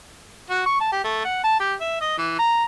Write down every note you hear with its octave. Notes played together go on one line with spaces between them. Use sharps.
F#4
C#6
A5
G4
A3
F#5
A5
G4
E5
D#5
E3
A#5